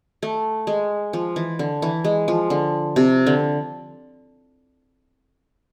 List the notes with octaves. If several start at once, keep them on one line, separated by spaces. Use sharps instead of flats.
A3
G#3
F3
E3
D3
E3
G#3
F3
D3
C3
D3